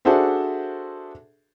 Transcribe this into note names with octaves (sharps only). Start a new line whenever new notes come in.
D4 F#4 G#4 A4 C5 E5